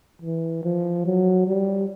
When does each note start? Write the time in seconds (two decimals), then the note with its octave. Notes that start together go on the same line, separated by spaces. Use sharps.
0.22 E3
0.64 F3
1.06 F#3
1.47 G3